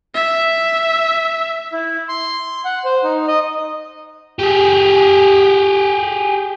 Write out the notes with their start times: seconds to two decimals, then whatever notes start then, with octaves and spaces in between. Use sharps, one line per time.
0.15 E5
1.73 E4
2.08 C6
2.65 F#5
2.85 C5
3.04 D#4
3.28 D#5
4.39 G4 G#4